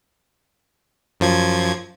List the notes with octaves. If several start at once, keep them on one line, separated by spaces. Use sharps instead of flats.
F#2 F3 G#6